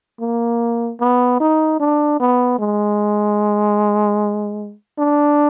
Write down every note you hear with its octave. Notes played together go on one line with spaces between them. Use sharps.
A#3
B3
D#4
D4
B3
G#3
D4